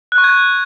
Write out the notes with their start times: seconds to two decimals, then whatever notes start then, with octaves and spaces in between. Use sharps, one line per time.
0.12 F#6
0.18 C#6
0.24 G#6